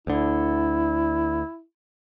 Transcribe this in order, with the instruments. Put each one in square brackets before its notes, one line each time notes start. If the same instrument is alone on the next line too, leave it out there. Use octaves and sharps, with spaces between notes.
[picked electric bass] D2 D3 [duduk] E4